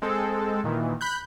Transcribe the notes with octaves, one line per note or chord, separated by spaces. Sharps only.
G#3 C4 A4
A#2 D#3 E3
B5 F#6 G6